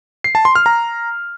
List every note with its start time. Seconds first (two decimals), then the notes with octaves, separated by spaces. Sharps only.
0.24 C7
0.35 A5
0.45 C6
0.55 F6
0.66 A#5